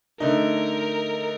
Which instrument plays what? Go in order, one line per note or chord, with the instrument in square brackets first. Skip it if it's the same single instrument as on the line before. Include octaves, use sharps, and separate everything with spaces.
[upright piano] D3 A3 D#4 [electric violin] A#4